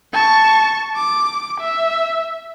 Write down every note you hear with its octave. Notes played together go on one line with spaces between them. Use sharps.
A5 C#6
D6
E5